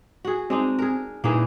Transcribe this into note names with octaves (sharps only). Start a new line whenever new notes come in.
F#4 G#4
G#3 C4 D4 D#4
G#4 A#4
A#2 A#3 D#4 E4 G#4 B4